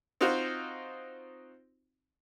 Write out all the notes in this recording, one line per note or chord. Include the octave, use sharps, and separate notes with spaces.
C4 D#4 F4 F#4 C5